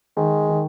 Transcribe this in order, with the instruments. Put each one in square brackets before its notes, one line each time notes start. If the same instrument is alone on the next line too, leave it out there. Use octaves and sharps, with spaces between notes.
[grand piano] D#3 [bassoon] G#3
[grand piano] D#3